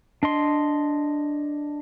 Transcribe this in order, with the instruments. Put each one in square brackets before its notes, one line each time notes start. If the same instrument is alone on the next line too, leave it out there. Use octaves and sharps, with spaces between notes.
[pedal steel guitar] D4 D#5 C6